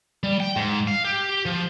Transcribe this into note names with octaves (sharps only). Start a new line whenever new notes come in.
G3
G5
G#2
F5
G4
F3